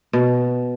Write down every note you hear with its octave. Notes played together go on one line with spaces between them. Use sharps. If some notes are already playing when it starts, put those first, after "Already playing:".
B2